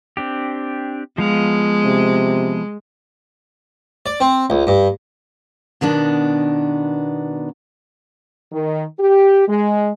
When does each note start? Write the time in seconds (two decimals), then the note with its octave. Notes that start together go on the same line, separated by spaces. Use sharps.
0.17 C4 D4 G4
1.18 F3 G#3 B3 F5
1.85 C3
4.06 D5
4.20 C4
4.50 C#2
4.67 G2
5.81 B2 D#3 B3 D4
8.52 D#3
9.00 G4
9.48 G#3